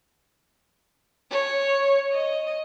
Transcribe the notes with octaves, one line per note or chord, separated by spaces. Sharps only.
C#5
D#5